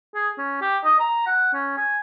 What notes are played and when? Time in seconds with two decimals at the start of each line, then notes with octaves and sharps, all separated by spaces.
0.15 G#4
0.38 C#4
0.61 G4
0.84 D#5
1.00 A#5
1.26 F#5
1.54 C#4
1.77 G#5